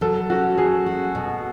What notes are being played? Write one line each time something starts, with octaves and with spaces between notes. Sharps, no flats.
F#3 A4
C#4 F#4
F#3 G#4
F#4
B2